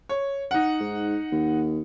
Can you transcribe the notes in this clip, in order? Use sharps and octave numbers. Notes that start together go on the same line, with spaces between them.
C#5
D#4 F#5
G#2
D#2